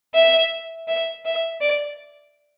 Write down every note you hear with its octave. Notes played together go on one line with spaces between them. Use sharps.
E5
E5
E5
D5